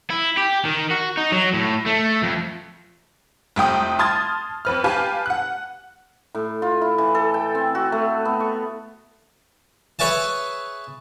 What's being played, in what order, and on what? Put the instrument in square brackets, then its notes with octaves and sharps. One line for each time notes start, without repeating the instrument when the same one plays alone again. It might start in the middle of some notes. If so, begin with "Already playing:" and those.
[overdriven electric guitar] E4
G4
D#3
F#4
D#4
F#3
A2
A3
F2
[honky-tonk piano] F1 C2 G5 D#6
A5 C6 D#6 F6 G#6 A6
F2 B4 F6
G4 B4 F5 G#5 A5
F#5 F#6
[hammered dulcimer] A2
F4
E4
E3
A4
G5
C4
F#4
A3
B3
C#6
[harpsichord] G#4 B4 C#5 E5 G#5 A5